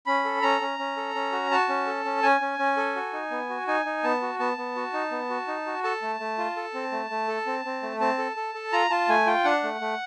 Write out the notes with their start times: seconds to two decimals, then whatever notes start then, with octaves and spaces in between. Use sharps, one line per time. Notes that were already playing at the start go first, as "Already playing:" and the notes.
0.06 C#4 B5
0.25 A4
0.42 C#4 A#5
0.61 C#4
0.79 C#4
0.97 A4
1.15 C#4
1.32 F#4
1.51 F#4 A5
1.69 C#4
1.87 A4
2.05 C#4
2.23 C#4 G#5
2.41 C#4
2.59 C#4
2.77 A4
2.96 F#4
3.13 D#4
3.31 B3
3.50 F#4
3.67 D#4 G#5
3.85 D#4
4.03 B3 A5
4.22 F#4
4.39 B3 A5
4.57 B3
4.76 F#4
4.93 D#4
5.11 B3
5.30 F#4
5.47 D#4
5.66 F#4
5.84 A4 A5
6.02 A3
6.20 A3
6.38 F4
6.57 A4
6.74 C4
6.92 A3
7.10 A3
7.28 A4
7.46 C4
7.65 C4
7.82 A3
8.00 C4 A5
8.18 A4
8.36 A4
8.54 A4
8.72 F4 A#5
8.90 F4 A5
9.09 A3 G#5
9.26 F4 G5
9.44 D4 F#5
9.63 A3
9.81 A3